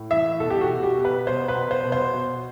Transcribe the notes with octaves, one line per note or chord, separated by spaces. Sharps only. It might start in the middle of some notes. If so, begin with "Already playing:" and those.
Already playing: A2
E3 E5
B2 A4
G4
F#4
B2
G4
B2
B4
B2 C5
B4
B2
C5
B2
C5
B2